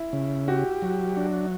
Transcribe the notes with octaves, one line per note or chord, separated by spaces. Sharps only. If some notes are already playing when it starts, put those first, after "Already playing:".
Already playing: E4
C#3
F#4 G4
F#3
D4